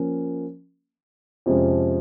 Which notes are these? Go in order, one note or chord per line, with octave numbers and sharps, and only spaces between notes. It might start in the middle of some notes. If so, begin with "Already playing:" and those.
Already playing: F3 A#3 C#4
F2 C3 F3 G#3 C#4